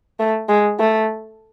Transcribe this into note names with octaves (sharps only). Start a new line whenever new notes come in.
A3
G#3
A3